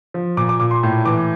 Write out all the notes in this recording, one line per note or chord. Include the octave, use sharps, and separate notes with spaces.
F3
A#2 D6
D6
A#2 D6
C6
A2
E3 D6